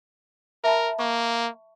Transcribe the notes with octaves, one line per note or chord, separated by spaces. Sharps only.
A#4 E5 A5 B5
A#3 C#6